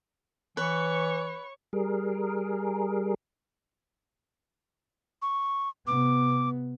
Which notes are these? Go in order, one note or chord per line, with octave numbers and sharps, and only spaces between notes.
E3 B4 C#5 C#6
G3 G#4 A#4
C#6
C3 B3 D6